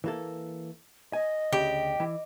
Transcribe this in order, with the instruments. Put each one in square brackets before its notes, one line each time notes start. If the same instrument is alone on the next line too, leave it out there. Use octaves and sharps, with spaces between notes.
[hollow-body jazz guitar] E3 A#3 A4
[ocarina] D#5 [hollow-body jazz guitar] G#5
[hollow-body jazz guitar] D2 C#3 [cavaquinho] G4
[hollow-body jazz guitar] E3